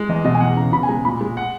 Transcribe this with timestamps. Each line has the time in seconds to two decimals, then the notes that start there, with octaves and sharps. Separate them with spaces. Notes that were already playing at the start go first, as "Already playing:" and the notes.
Already playing: G#3
0.09 E2 D#5
0.25 B2 D#5
0.35 G#5
0.40 E2 F#5
0.57 C#3 A#5
0.73 B2 B5
0.83 G#5
0.89 G#3 A#5
1.05 A#2 B5
1.21 G#3
1.37 F#5